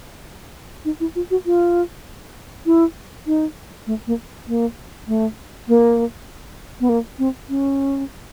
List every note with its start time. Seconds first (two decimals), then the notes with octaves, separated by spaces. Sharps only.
0.85 D#4
1.00 E4
1.15 F4
1.31 F#4
1.46 F4
2.66 E4
3.27 D#4
3.87 A3
4.07 A#3
4.47 A#3
5.08 A3
5.68 A#3
6.80 B3
6.89 A#3
7.19 C4
7.49 C#4